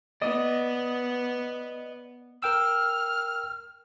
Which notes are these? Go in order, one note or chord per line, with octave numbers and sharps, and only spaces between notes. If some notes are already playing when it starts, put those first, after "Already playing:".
B3 D5 D#5
A#4 G5 E6 F6